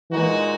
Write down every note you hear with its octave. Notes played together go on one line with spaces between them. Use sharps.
A#2 E3 G#3 D#4 F#4